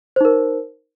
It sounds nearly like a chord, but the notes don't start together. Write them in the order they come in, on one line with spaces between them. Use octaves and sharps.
C5 D#4 A#4